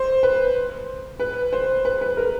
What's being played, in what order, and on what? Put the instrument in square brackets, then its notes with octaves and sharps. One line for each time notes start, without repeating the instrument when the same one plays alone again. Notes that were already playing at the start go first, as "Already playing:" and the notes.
Already playing: [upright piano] C5
B4
B4
C5
B4
B4
A#4